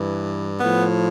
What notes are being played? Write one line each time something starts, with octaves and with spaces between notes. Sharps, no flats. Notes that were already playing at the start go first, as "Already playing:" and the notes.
Already playing: G2 E3
A2 F3 B3